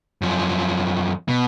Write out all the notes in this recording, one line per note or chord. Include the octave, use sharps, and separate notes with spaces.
F#2 F3
B2